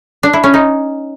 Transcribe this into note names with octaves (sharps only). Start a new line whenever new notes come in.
D4
E4
C#4
D#4